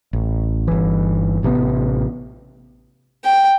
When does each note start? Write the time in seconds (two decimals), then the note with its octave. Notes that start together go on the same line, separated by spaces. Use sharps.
0.13 A1
0.68 G1 E3
1.43 A1 C3 D#3 B3
3.24 G5